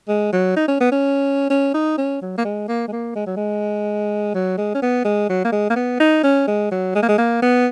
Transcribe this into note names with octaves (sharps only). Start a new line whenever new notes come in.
G#3
F#3
D#4
C#4
B3
C#4
C#4
D#4
C#4
F#3
A#3
G#3
A#3
G#3
A#3
G#3
F#3
G#3
F#3
G#3
C#4
B3
G#3
F#3
A#3
G#3
A#3
B3
D#4
C#4
G#3
F#3
G#3
A#3
G#3
A#3
B3